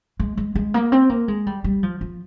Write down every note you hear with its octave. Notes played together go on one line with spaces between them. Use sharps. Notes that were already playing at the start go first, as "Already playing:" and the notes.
G#3
G#3
G#3
A#3
C4
A#3
G#3
G3
G3
F3
F3